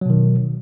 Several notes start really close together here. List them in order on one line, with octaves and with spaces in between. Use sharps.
F#3 B2 D#3